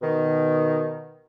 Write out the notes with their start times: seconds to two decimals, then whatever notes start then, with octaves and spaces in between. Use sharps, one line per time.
0.02 B2 D#3